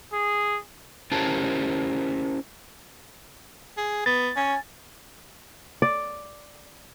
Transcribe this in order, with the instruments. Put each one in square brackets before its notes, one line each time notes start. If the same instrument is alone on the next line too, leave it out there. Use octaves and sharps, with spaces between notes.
[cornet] G#4
[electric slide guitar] C#4 E4 G4 A#4 C5 A5
[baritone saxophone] G#4
[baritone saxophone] B3 [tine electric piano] A6
[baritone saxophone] C#4 [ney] G#5
[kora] D5